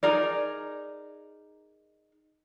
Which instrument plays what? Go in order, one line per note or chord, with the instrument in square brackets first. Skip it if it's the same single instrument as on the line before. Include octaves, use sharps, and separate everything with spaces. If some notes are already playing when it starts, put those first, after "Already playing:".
[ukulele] D#4 G#4 A#4 D5